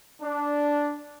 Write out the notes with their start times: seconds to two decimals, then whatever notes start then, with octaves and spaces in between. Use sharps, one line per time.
0.21 D4